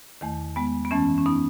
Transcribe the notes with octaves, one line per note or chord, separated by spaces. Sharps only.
E2 D#3 A3
G#3 B3
B3
F#2 E3 A3 C#4
C#4
B3 D#4